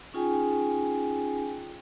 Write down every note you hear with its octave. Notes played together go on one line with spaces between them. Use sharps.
C#4 D#4 F4 G#4 G5 G#5